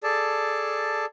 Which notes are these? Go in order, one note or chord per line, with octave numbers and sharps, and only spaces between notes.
G#4 A4 D5 A5